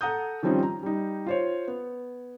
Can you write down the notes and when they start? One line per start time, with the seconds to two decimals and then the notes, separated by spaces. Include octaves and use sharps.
0.01 A4 F#5 A#5 D#6 G6
0.43 D#3 F3 G3 C4 C#4 D#4
0.63 A#5
0.83 G3 D#4
1.26 F4 C5 C#5
1.67 B3